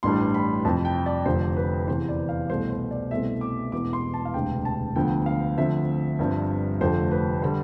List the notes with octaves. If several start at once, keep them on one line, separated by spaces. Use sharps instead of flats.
A1 G2 E3 G3 D4 C6
B5
F2 C3 F3 C4 A5
G5
D5
F1 F2 D3 F3 C5
B4
E2 C3 E3 C5
D5
F5
C2 B2 A3 C5
C5
D5
C2 B2 A3 C4 E5
D6
E1 E2 B2 D6
C6
A5
F5
E1 D2 C3 G5
A5
D2 D3 F3 B3 G5
F5
D2 D3 F3 C4 E5
G1 G2 F3 C4
F1 F2 D3 F3 A3 C5
B4
D3 G3 C5